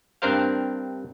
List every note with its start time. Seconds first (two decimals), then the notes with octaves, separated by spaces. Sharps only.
0.22 G2 C4 D4 A#4 C5 F5